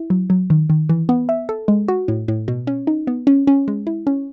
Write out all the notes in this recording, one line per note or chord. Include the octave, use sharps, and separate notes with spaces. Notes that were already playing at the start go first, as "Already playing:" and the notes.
Already playing: E4
F#3
F#3
D#3
D#3
E3
B3
E5
A4
G#3
F#4
A2
A2
B2
C#4
D#4
B3
C#4
C#4
G#3
E4
C#4